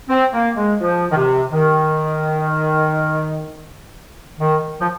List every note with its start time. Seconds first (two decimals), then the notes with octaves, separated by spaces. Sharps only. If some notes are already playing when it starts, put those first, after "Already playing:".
0.09 C4
0.33 A#3
0.56 G#3
0.81 F3
1.11 D#3
1.17 C3
1.52 D#3
4.39 D#3
4.81 F3